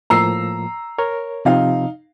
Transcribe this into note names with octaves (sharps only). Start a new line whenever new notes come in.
A2 F3 A#3 A#5 E6 C7
A#4 C#5
C3 F3 C4 D#4 F5